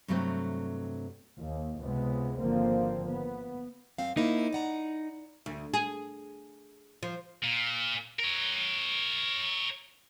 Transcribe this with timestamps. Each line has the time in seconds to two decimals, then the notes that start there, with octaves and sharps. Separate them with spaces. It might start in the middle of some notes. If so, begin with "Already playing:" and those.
0.08 G2 C3 F#3 A3 C4
1.39 D#2
1.82 C#2 C3 G#3 B3
2.40 G#1 D3 F3 A#3 C4
3.09 B3
3.98 F#2 C4 F5
4.17 A#3 C4 D#4 E4
4.53 D5 F#5 A#5
5.46 D2
5.74 G#4
7.03 F3
7.44 A#2
8.19 A#4 C#5